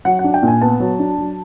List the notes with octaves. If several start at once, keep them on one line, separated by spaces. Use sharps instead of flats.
F#3 F#5
F#5
D4
G5
A#2
G#5
B3 A5
F#3
D4
F#3